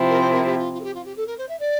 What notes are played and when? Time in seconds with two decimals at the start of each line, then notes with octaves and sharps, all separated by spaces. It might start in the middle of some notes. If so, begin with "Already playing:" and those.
Already playing: C3 F3 C4 E4
0.10 A#4
0.20 C5
0.32 A#4
0.45 G4
0.59 F4
0.74 F4
0.81 A4
0.84 G4
0.95 F4
1.05 G4
1.17 A4
1.27 A#4
1.38 C5
1.49 E5
1.60 D5